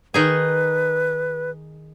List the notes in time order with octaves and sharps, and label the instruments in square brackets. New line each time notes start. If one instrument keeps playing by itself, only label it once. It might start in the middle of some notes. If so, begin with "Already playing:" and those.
[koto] D#3 D#4 G#4 [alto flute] B4